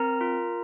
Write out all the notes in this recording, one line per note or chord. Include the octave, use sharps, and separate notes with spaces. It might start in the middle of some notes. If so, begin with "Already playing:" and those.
Already playing: C4 A#4 A#5
F4